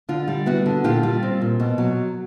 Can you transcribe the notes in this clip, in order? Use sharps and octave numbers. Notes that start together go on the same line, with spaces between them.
D3 F4
G3
B3 E4 F#4
D3
A#2 F4 G4
G3 F4
C4
A#2
B2
F#3